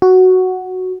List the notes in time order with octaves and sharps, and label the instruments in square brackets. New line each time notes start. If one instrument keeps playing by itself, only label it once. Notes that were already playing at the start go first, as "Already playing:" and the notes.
[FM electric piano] F#4